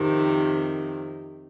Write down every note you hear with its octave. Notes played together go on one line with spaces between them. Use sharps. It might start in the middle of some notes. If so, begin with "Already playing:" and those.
Already playing: F2 C3 D#3